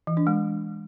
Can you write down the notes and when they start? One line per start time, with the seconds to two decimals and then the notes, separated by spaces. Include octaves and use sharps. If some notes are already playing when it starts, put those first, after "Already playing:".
0.07 E3
0.17 D4
0.27 G#3